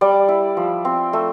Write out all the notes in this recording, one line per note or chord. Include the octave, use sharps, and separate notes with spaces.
G3 D5
E4
F3
C4
A3